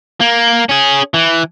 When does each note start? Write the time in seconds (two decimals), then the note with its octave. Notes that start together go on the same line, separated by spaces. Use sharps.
0.21 A#3
0.69 C#4 G#4
1.14 E3